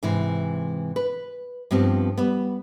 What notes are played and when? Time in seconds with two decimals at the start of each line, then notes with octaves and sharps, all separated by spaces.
0.03 G#2 C3 E3
0.96 B4
1.71 G2 F3 B3 C4 G4
2.18 G3 B3